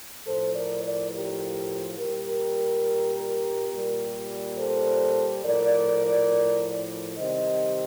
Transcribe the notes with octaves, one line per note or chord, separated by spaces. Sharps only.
A2 F3 A4 C5
A#4 D5
A#4 D5
G4 A#4
A#2 G3 G4 A#4
A#2 G3
A4 C5
A2 F3 A#4 D5
C3 D#3 G3 C5 D#5